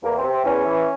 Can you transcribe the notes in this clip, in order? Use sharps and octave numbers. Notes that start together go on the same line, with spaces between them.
E2 A#3
C4
C3
C4
E2 C#4
E3